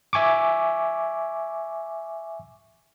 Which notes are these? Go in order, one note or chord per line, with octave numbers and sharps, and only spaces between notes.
E5 G#5 C#6 D6